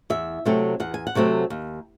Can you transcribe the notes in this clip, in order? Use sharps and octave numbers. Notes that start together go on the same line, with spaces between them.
E2 E5
C3 F#3 A3 C4
E2 F#5
G#5
F#5
C3 F#3 A3 C4
D#2